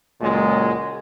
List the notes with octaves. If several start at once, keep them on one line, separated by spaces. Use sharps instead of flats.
C#2 A#2 F#3 G#3